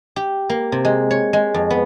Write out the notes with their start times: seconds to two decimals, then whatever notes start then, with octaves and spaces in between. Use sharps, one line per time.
0.16 G4
0.49 A#3
0.72 C3
0.85 G#3
1.11 C#5
1.33 G#3
1.54 F2
1.70 B3